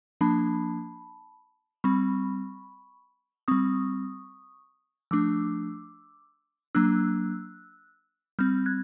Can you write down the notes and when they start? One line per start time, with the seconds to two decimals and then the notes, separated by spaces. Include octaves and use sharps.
0.21 F3 A#3 D4 A5 B5
1.84 G3 C4 B5 C#6
3.48 G3 C4 C#6 D#6
5.11 F3 A3 D4 D6 E6
6.75 F#3 A#3 D4 E6 F#6
8.39 G3 C4 F6 G6
8.66 F#6 G#6